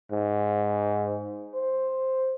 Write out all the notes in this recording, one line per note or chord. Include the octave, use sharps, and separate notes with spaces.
G#2
C5